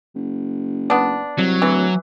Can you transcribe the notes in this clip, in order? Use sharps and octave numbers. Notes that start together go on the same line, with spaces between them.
F#1
B3 D4
C2 F#3
D1 E3